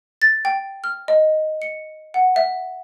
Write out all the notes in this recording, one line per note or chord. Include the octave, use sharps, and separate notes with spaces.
A6
G5
F6
D#5
C#7
F#5
E5